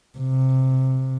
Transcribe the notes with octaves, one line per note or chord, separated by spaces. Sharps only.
C3